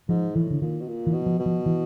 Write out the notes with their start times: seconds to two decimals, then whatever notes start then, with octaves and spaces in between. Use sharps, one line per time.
0.09 G#2 F3
0.35 A2 E3
0.50 D3
0.61 A#2 D#3
0.81 B2
0.87 A#2
1.07 E3
1.13 B2
1.26 F3
1.39 B2
1.46 F3
1.66 E3